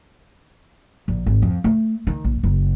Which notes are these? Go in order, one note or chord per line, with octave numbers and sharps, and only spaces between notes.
A#1
G#1
F2
A3
D#3
A#1
F#1